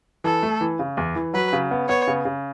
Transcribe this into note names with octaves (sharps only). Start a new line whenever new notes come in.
E3 A4
A3
E3
C#3
E2
E3
F#3 B4
C#3
B3
B3 C#5
C#3
C#3